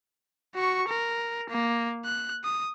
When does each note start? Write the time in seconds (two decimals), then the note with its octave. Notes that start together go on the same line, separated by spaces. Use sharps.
0.55 F#4 C#6
0.88 A#4
1.50 A#3
2.05 F#6
2.44 D#6